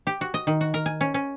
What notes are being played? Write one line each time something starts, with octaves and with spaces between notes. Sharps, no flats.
G4
F#4
D#5
D#3
F#4
A#4
G#5
C#4
C#4